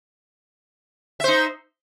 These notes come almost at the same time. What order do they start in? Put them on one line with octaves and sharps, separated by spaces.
E5 C5 D#4